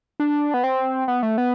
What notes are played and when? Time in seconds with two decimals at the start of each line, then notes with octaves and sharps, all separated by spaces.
0.20 D4
0.54 B3
0.64 C4
1.08 B3
1.23 A3
1.38 B3